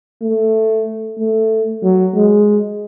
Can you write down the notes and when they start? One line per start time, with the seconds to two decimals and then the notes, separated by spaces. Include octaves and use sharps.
0.22 A3
1.19 A3
1.83 F#3
2.15 G#3